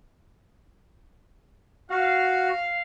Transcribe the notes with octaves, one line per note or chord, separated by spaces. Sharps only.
F#4 F5